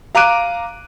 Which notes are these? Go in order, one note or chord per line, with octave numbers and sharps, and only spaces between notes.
F5 A#5 D6 F#6 D7 D#7